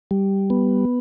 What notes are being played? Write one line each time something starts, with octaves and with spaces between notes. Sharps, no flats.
G3
B3